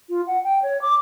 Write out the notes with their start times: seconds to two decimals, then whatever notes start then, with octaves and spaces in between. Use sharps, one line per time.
0.09 F4
0.27 F#5
0.44 G5
0.63 C#5
0.81 D6